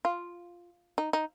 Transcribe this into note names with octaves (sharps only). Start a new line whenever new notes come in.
F4
D#4
D#4